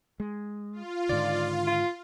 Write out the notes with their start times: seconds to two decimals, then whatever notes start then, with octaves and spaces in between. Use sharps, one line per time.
0.20 G#3
0.73 F4
1.09 G#2 D3 D#3 D5
1.67 F4